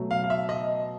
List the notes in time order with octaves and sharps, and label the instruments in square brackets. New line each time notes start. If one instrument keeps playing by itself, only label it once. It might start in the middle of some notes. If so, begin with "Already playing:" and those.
Already playing: [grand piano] B2 F#3 A3
[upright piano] F5
F5
E5
D#5